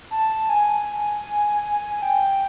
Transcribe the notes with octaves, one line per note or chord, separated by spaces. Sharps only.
A5
G#5
G5